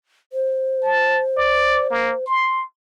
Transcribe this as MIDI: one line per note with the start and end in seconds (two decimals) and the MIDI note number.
0.33 2.25 72
0.83 1.21 81
1.37 1.87 74
1.90 2.13 58
2.27 2.63 84